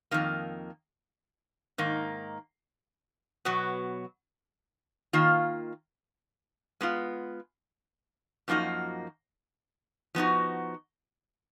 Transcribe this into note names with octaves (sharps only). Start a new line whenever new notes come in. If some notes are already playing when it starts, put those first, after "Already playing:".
F2 D#3 A#3
G#2 D#3 A#3 D#4
B2 F#3 B3 F#4
D#3 A#3 F4
G#3 B3 F4
F#2 F3 A#3 D#4 F#4
F3 B3 D#4 F#4